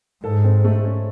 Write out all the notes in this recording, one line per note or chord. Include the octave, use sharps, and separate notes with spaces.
G#2 A4
C4
A3
C#4